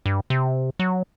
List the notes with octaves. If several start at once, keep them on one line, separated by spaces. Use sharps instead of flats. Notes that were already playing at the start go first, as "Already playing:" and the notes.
G2
C3
F#3